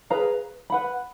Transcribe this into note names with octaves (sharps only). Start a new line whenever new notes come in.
G#4 B4 F5 A#5
B4 F#5 B5